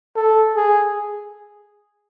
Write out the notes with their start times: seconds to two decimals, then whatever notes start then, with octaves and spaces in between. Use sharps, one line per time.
0.16 A4
0.55 G#4